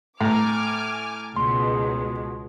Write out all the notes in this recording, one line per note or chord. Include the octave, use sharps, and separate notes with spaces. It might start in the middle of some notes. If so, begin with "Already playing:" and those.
A2 G#5 A#5 D6 F6
C#2 B2 G#3 C6